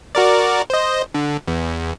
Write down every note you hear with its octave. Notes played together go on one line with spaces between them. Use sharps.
F#4 A#4 D5
C5 D#5
D3
E2